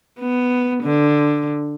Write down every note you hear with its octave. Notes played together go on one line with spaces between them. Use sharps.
B3
D3